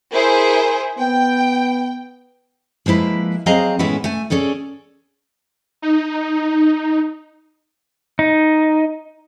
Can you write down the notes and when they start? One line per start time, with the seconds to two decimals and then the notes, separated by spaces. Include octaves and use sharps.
0.13 E4 G#4 A#4 C5
0.99 B3 G5
2.86 F3 G#3 A#3 E4 B4
3.46 F#3 C4 G#4 D#5 F5 A#5
3.79 A2 E3 G#3 B3 C#4 E4
4.04 A3 G#5
4.30 C#4 G#4 A4 D5
5.82 D#4
8.19 D#4